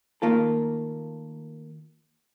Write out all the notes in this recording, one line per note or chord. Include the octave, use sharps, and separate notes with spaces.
D#3 A3 A#3 F4 A4